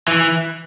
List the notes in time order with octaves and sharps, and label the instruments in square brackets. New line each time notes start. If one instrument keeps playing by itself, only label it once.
[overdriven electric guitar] E3